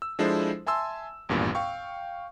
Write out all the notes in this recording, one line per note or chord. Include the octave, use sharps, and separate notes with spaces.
E6
F3 G#3 D4 E4 A4 C5
E5 G#5 A5 C6 E6
G#1 E2 G2 A#2
F5 G5 C#6